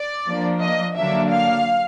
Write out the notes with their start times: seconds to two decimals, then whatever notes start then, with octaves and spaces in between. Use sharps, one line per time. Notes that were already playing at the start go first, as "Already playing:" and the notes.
Already playing: D5
0.28 F3 A#3 D4
0.62 D#5
0.96 D3 F#3 A#3 D4 E5
1.30 F5